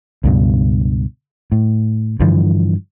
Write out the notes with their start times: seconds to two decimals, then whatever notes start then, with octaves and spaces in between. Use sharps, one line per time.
0.24 C#2 G2 B2
1.52 A2
2.20 G2 D3 E3 F3